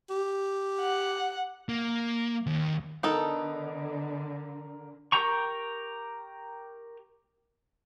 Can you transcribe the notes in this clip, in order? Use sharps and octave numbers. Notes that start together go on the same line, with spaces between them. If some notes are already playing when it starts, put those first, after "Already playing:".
G4
F#5
A#3
D#2
D3 B3 D#4 A4 A#4
G4 A#4 G5 A#5 C#6